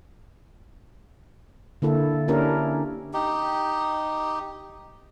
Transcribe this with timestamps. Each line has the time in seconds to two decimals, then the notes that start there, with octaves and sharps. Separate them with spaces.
1.82 D3 A#3 E4 A4
2.28 A#3 C#4 D4 E4 G4 A#4
3.13 D#4 G4